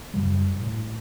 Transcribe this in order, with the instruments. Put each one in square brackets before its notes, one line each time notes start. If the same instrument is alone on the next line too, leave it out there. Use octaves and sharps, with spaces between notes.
[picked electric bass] F#2 C#3 G3
A2